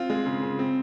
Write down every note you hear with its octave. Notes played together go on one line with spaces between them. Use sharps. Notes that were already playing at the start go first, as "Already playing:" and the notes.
Already playing: C4 F4
G#3
C#3
C#3
C4